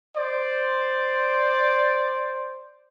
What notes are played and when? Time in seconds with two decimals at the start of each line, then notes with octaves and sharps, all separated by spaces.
0.16 C5 D5